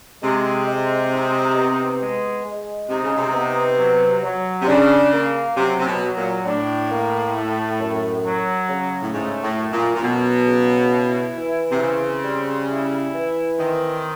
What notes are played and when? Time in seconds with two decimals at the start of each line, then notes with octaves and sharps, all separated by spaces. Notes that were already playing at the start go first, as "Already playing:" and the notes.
0.23 C3 G#3
0.67 G#3
1.12 D#4
1.56 B3
2.01 G#3
2.45 G#3
2.89 C3 D#4
3.03 C#3
3.17 C3
3.34 B3
3.79 F#3
4.23 F#3
4.62 C3
4.68 C#3 D4
5.13 A#3
5.56 C3 F#3
5.80 C3
5.87 B2
6.02 F#3
6.16 A#2
6.45 A2 D4
6.91 A#3
7.35 A3
7.80 F#2
8.24 F#3
8.69 C#3
9.02 A2
9.13 G#2 A3
9.43 A2
9.58 F#2
9.72 A#2
9.95 A#2
10.02 B2 F#3
10.47 C#3
10.91 E4
11.36 E3
11.72 C3
11.80 C#3 C4
12.25 G3
12.70 E4
13.14 E3
13.58 D#3 C4